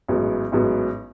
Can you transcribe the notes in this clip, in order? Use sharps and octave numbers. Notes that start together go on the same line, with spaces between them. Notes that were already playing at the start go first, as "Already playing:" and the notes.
A1 G#2 F#3 B3
A1 G#2 F#3 B3